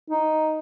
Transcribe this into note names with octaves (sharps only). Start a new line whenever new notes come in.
D#4